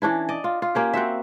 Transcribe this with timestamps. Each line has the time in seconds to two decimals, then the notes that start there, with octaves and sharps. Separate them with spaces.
0.02 E3 C#4 D4 E4
0.29 D5 D#5
0.44 F4
0.62 F4
0.75 A#3 C#4 G4
0.93 C4 F#4 C5 E5